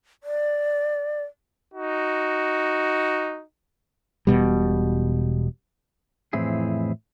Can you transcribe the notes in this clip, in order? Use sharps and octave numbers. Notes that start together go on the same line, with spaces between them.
D5
D#4 F#4
E1 B2 G3
F2 A2 E3 C4 E4 G#4